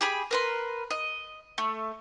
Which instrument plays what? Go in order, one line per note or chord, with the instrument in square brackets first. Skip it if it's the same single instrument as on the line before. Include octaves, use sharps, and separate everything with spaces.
[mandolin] G4 G#4 B5
A#4 B4 C6
D#5
A3